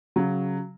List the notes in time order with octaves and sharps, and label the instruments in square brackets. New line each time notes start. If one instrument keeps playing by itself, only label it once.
[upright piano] C#3 F#3